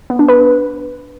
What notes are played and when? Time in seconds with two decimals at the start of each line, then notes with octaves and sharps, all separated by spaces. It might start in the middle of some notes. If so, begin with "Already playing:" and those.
0.10 B3
0.19 D4
0.28 B4